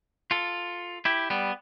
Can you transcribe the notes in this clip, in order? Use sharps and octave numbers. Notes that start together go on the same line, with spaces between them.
F4 A4
E4 G4
G3 B3